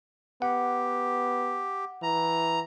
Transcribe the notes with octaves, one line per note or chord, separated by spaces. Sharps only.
B3 G4 F#5
E3 A#5